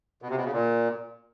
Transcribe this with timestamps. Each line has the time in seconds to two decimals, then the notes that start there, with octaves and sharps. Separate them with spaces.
0.22 B2
0.30 C3
0.37 B2
0.45 C#3
0.52 A#2